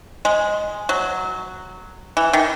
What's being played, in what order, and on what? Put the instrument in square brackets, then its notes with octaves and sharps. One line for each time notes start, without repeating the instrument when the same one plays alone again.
[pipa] G#3
F#3
E3
D#3